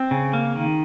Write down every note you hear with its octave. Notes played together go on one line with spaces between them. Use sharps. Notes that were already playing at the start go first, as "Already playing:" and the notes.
Already playing: C4
C#3
A#3
D#3